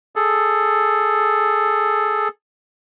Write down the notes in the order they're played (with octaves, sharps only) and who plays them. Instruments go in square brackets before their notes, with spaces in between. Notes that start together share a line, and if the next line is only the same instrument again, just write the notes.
[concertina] G#4 A4